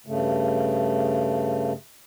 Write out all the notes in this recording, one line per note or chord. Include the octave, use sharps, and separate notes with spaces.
G2 C#3 A3